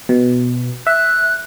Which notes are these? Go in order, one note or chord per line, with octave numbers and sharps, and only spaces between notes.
B2
E5 F#6